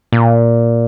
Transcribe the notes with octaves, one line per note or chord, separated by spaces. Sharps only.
A#2